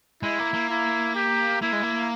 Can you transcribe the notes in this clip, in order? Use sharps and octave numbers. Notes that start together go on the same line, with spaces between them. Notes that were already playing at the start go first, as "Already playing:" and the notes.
G#3 E4
A#3
A#3
E4
G4
A#3 E4
G#3
A#3